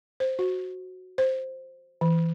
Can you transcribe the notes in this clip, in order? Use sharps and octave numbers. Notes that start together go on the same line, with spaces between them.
C5
F#4
C5
E3